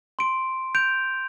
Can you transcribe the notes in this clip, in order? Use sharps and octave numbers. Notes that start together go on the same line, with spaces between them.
C6 D7
G6 D7 F7